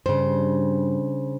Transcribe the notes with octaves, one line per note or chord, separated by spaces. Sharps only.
G2 C#3 C5